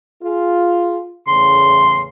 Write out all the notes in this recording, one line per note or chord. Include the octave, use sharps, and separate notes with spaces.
F4 G#4
E2 A2 C#3 C6